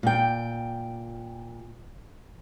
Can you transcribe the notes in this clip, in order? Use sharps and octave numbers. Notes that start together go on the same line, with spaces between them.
A#2 G5